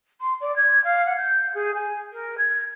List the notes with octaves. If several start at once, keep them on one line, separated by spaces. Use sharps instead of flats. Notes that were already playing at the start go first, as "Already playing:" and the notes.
C6
D5
G#6
F5
F#5
G6
G#4
G#5
A#4
G#6